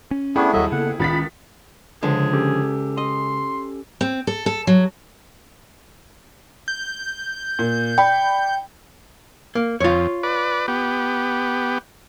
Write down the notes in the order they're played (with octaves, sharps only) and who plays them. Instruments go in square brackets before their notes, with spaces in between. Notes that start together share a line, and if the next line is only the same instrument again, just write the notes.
[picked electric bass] C#4
[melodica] A3 B3 D4 [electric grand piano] E4 G#4 G5 [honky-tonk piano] C#6
[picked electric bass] D#2 G3 [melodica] F#3 D#5 E5 [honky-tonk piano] A4
[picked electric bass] C#3 A#3 B3 [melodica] F#5
[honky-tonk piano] C#2 A6 B6 [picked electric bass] D#3 [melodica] B5
[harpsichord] C#2 [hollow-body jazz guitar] D3 F3 [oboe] G#4
[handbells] C#4 G4 A4
[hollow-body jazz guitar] D#5 [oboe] C6
[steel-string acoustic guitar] C4
A4
A4
F#3
[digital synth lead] G6
[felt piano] A#2
[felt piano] D5 B5 [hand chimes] G5
[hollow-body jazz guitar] A#3
[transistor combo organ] F2 [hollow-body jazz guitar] F4 C#5
[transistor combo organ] B4 D5
B3 G4